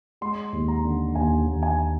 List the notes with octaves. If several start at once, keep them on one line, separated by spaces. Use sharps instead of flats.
G#3 C6
D#2
A#5
D3
D#2 G#5
D#2
G#5